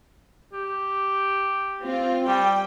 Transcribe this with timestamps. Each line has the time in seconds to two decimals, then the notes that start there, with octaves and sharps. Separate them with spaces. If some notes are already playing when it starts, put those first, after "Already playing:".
0.53 G4
1.83 C4 F4
2.28 G3 G5